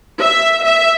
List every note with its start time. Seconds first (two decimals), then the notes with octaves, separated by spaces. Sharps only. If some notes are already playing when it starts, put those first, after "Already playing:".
0.22 E5
0.64 E5